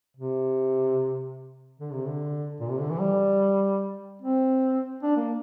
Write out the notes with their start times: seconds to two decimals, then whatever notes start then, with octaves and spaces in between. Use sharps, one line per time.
0.17 C3
1.80 D3
1.93 C3
2.07 D3
2.60 A#2
2.70 C3
2.80 D3
2.90 E3
3.00 G3
4.22 C4
5.03 D4
5.16 A#3